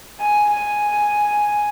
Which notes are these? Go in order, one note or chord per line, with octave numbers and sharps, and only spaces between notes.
G#5
G#5